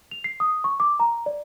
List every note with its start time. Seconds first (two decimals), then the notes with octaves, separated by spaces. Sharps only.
0.11 F7
0.24 C7
0.40 D#6
0.64 C#6
0.80 D6
1.00 A#5
1.26 D5